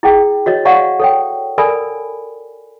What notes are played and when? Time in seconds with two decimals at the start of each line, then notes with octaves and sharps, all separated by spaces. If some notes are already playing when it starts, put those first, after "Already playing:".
0.03 E4 G#4 G5
0.46 F#4 C#5 D#5
0.65 C#5 D5 F5 F#5 A#5 C#6
1.00 A4 C#5 G5
1.58 A4 A#4 D5 G#5 B5